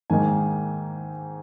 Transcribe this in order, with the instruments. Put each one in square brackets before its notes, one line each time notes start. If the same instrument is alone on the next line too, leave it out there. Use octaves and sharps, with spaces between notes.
[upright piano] G#2 D#3 A#3 D#4 G#5